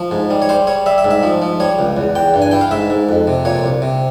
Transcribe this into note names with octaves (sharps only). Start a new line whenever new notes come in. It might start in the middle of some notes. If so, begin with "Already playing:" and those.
Already playing: F3
G#2
G3
C#5
G3 C5
G3 C#5
G3 E5
E5
G#2
E5
F3
F3
G3 C#5
C#2
E2
E2 G5
G2
G#5
E3 G5
F5
G#2 E5
G#2
F2
C3
A#2 C#5
C2
C3